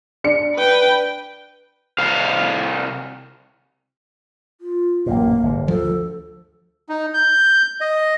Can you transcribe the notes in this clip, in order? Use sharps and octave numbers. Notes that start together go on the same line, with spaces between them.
D4 C#7
B4 G5
C2 F5
F4
A1 F#2 A#2 A#3
G1 G#2 C3
D2 F3 A4
D#4
G6
D#5